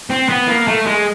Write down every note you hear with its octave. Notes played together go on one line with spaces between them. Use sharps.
C4
B3
A#3
A3
G#3